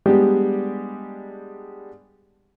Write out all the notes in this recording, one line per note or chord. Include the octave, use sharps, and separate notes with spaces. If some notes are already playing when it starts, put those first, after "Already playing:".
G3 G#3 B3 D4 G4